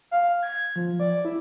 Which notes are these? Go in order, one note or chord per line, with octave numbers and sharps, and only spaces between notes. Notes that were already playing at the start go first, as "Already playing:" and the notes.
F5
G#6
F3
D5
E4